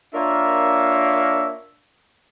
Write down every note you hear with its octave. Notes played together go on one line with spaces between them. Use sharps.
A#3 D4 F4 A#4 C#5 E5